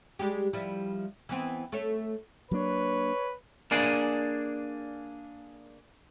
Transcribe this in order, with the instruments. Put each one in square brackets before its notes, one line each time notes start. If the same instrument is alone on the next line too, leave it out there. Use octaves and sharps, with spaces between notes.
[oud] G3 G#3 G4
F3 G3 E4
E3 B3 C4
A3 C#5
[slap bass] F#3 A#3 D4 [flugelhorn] B4 [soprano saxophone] C#5
[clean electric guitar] A#3 D4 G#4 D5